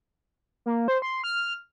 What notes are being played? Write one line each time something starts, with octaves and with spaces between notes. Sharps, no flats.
A#3
C5
C6
F6